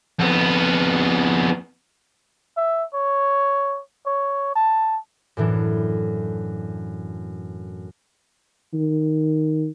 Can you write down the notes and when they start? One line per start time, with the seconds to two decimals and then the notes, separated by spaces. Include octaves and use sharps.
0.19 F2 B3
2.57 E5
2.94 C#5
4.06 C#5
4.55 A5
5.37 F#2 A2 E3 D4
8.74 D#3